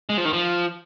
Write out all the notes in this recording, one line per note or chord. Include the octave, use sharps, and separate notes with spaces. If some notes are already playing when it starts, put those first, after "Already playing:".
G#3
F3
D#3
F3